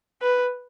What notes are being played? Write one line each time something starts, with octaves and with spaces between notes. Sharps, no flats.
B4